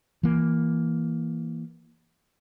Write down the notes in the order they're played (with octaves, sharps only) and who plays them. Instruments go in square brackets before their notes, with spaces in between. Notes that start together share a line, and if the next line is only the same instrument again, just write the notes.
[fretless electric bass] E3 A#3